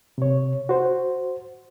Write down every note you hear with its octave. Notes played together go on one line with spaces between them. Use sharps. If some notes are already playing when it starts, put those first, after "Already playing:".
C3 C#5
F#4 C5